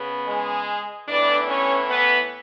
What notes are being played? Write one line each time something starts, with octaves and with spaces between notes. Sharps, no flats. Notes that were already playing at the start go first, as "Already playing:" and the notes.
Already playing: C#3 B3
G#3 G#4
A2 E3 B3 D4 D5
C#4 C#5
B3 B4